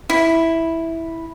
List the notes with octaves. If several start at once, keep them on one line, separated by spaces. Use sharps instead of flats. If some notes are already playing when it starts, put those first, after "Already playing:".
E4